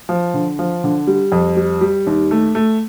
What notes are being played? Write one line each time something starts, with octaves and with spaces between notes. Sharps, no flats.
F3
D3
F3
D3
G3
F2
G3
G3
D#2
A3
A3